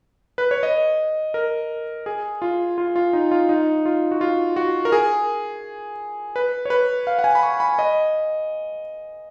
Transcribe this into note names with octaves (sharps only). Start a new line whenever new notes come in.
B4
C#5
D#5
A#4
G#4
F4
F4
F4
D#4
F4
D#4
F4
F#4
F4
F#4
A#4
G#4
B4
C#5
B4
F5
F#5
G#5
B5
C#6
B5
D#5